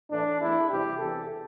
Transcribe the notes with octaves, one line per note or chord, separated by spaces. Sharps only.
A2 E3 A3 D4
E2 E3 A3 E4
E2 C3 G3 G4
E2 C3 E3 A4